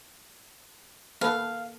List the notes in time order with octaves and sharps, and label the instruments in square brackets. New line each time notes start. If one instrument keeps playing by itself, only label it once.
[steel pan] A#3 A4 B4 [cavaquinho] F5